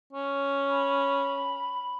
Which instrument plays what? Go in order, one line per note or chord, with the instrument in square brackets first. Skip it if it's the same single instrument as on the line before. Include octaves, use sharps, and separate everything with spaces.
[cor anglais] C#4
[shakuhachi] B5